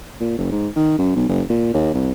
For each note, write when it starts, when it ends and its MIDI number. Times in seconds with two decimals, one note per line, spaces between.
0.21 0.35 46
0.39 0.50 30
0.52 0.68 44
0.76 0.95 51
0.99 1.11 42
1.16 1.28 35
1.29 1.42 30
1.50 1.74 46
1.74 1.92 39
1.94 2.13 36